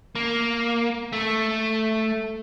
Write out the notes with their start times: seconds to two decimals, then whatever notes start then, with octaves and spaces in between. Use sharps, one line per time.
0.15 A#3
1.13 A3